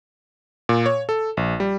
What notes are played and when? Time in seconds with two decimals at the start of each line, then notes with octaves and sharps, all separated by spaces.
0.69 A#2
0.86 C#5
1.09 A4
1.37 A#1
1.60 G3